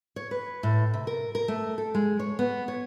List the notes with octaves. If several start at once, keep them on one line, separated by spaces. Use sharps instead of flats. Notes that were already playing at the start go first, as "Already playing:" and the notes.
C#5
B4
A2
C3
A#4
A#4
A3
A4
G#3
C#5
B3
C#5